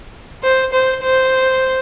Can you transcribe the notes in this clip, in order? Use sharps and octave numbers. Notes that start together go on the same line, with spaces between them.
C5
C5
C5